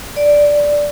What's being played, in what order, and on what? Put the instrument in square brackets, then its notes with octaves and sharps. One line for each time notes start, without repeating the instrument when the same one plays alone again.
[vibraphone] D5